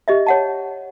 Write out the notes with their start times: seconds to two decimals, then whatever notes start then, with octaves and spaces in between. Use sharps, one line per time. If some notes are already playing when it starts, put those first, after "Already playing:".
0.08 G4 D#5 E5
0.26 C#5 F#5 A5